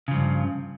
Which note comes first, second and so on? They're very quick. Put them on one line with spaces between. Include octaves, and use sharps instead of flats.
C#3 F3 G2